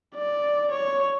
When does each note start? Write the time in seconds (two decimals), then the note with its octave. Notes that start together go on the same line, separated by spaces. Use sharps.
0.15 D5
0.72 C#5